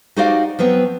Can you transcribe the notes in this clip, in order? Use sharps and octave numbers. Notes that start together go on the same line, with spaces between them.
D#4 F#4 G4 C5 D5 F5
F3 F#3 B3 C4